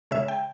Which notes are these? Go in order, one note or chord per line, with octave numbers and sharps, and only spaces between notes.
C#3 G#3 E5
G5